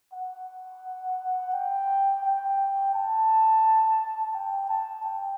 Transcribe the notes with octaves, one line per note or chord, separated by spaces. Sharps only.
F#5
G5
G5
A5
G5
A5
G5